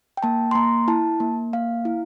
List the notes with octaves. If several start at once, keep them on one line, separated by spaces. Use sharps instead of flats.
G5
A#3 A5
C6
A#3 A#5
E4 A5
A#3
A#3 F5
E4